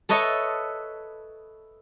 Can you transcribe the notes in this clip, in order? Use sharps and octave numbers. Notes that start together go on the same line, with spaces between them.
A4 B4 C#5 D#5 E5 A5